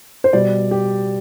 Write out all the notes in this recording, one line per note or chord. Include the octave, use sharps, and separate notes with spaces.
C5
B2 G3 D5
G4